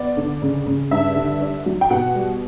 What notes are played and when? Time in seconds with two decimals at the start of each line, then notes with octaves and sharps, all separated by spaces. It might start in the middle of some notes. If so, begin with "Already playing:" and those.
Already playing: B3 D5
0.17 D3
0.42 C#3
0.66 C#3
0.91 G2 E5
1.16 D3
1.41 D4
1.66 F#3
1.81 G5
1.90 B2 F#5
2.15 G3